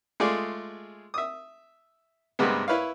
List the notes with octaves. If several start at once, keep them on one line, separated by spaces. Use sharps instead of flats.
G#3 A3 F4 G#4 D5
E5 D#6
G2 C3 G#3 A#3 B3
E4 B4 C#5 F5